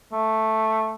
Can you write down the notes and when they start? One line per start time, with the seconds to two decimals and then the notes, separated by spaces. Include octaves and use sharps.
0.12 A3